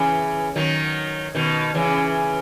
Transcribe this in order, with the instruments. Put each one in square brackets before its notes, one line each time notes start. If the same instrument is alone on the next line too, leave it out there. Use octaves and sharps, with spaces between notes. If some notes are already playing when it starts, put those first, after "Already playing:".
Already playing: [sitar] C#3 E3
D#3 F#3
B2 D#3
C#3 E3